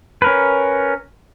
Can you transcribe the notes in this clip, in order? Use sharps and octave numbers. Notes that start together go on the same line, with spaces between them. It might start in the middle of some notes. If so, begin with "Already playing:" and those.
C#4 A#4 B4